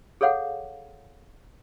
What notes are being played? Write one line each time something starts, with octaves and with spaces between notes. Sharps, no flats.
G#4 A4 C#5 F5 F#5